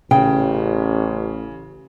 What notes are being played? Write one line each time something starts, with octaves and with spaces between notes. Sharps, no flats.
A1 C#3 G5